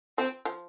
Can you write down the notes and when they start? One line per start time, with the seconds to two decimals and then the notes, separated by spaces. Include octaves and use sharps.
0.18 F3 C4
0.45 F3